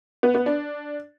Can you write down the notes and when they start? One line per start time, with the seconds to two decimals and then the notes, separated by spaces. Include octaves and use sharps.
0.23 B3
0.35 B3
0.46 D4